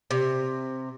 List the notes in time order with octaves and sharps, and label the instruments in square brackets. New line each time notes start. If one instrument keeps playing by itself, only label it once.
[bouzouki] C3